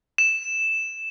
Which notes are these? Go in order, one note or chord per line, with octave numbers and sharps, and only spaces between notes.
E7